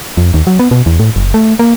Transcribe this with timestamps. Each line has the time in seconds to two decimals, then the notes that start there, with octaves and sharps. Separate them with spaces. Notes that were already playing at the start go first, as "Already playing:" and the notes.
0.17 F2
0.34 D#2
0.47 F#3
0.59 B3
0.71 B2
0.86 E2
1.00 A2
1.16 F#1
1.34 A3
1.59 A#3